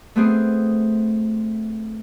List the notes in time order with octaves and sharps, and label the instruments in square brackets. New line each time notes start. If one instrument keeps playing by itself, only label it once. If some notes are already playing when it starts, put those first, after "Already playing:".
[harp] A3 B3 C4 G#4